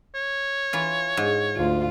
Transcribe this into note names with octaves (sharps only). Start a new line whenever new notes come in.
C#5
E3 F4
G#2
D2 F4